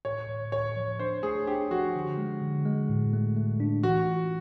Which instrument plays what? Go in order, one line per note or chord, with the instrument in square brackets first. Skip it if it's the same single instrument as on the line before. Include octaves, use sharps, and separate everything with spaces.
[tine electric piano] A2 [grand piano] C#5
[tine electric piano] A2
[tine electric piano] A2 [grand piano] C#5
[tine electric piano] F3
[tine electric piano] D4 [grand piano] C5
[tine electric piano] A3 [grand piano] G#4
[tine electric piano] D4 [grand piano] G4
[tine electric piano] F3 [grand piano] F#4
[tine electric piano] D3
G#3
D3
G#3
A2
A3
A3
D4
[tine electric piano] E3 [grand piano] F#4
[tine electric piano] F4